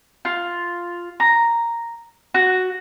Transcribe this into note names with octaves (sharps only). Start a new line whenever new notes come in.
F4
A#5
F#4